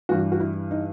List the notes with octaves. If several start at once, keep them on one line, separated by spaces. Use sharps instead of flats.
G2 E3 G3 F#4
F#4
E4
D#4